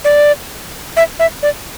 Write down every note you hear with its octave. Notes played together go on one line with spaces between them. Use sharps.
D5
E5
E5
D5